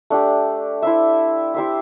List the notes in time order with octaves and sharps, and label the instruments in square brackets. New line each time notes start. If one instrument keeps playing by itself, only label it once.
[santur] A3 D4 G4
E4 C5 E5
E4 G4 C5 E5